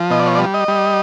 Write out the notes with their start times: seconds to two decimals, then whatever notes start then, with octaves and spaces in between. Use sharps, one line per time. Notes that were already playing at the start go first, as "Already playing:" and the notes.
Already playing: F3
0.10 B2 D#5
0.19 D5
0.26 C#5
0.35 D5
0.39 G3
0.54 D#5
0.68 G3